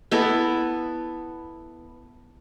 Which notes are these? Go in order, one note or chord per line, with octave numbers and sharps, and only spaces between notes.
B3 E4 A4